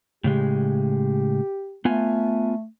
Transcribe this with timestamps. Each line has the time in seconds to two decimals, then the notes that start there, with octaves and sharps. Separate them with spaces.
0.24 A2 C#3 G#3 G4
1.85 A3 B3 F4 G#5